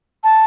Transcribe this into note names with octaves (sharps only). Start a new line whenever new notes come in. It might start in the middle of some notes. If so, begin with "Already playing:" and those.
A5